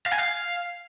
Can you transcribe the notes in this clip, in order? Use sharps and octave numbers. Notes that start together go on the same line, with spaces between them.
F5
G#5
F5